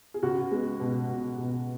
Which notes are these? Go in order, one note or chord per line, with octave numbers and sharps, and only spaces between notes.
G#4
C#2 F#4
G#3 B3 G#4
B2
B2
B2